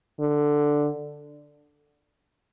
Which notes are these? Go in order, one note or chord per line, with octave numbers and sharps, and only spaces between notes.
D3